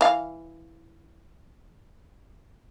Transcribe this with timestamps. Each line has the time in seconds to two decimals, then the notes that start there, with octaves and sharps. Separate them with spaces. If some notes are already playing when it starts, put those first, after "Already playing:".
0.01 E3 F5